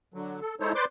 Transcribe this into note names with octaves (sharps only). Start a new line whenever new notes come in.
D3 F#3
A4
G#3 D#4 E4 A4 C5 C#5
B4 C5 D5 C6 D6